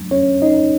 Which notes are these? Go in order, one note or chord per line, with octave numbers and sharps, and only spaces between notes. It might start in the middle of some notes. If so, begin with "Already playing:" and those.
Already playing: F#3 A3 D4
C#4 C#5
D#4 D#5